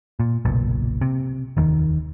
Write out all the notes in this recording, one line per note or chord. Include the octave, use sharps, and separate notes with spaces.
A#2
F#1 B1 A#2
C3
F1 D#2 D#3